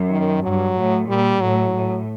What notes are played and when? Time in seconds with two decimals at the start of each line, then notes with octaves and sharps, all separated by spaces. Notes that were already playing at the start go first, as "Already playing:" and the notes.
Already playing: F#2
0.10 D#3
0.43 G2 F#3
0.76 A2
1.08 A#2 G3
1.41 A2 F#3
1.74 A2